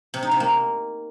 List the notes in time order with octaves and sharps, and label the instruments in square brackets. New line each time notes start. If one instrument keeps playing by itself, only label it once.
[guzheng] C3
D#4
C3
A#3